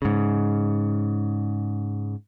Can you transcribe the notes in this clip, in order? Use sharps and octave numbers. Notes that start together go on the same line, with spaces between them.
G#2 C#3